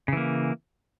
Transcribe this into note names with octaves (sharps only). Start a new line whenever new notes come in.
C#3 E3 A#3